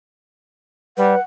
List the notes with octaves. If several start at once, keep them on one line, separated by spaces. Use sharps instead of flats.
G3 B4 F#5